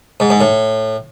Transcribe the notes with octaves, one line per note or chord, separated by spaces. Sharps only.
G#2
G#2
A2